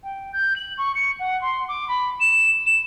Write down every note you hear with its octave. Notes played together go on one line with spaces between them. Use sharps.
G5
G6
F#7
C#6
C#7
F#5
C6
D6
B5
E7
E7